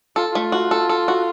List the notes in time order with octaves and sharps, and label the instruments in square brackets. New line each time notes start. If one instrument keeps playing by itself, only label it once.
[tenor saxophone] F4 [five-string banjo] A4
[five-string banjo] A3 [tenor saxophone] F4
[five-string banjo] F#4
A4
A4
F#4